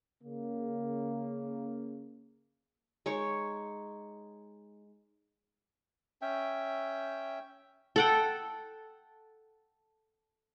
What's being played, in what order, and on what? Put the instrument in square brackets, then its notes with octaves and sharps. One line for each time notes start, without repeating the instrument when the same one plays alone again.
[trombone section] C#3 A#3
[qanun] G#3 D#4 C#5 C#6
[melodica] C#4 E5 G5
[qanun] A4 F#5 G5